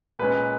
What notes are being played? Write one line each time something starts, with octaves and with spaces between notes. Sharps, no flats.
A#2 G#3 C#4 B4